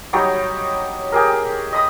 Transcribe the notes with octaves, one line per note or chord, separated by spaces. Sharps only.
F#3 G3 D#4 C#5
G4 G#4 A#4
D#5 B5 D#6